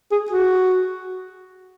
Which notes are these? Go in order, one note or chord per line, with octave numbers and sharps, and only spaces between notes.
G#4
F#4